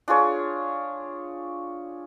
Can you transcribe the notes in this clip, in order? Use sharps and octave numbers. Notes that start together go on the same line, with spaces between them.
D4 F4 G#4 C#5